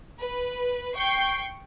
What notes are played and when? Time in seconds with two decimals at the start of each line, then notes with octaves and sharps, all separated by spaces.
0.19 B4
0.95 G5 C#6 G6 C7